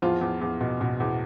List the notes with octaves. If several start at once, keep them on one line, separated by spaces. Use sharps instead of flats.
E2 F3 F4
E2
E2
B2
B2
E2